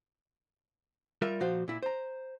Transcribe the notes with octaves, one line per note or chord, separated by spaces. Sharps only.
G3 F4 A#4 D5 E5
A#2 F3 F#4 C5 F5
A#2 E4
C5 A#5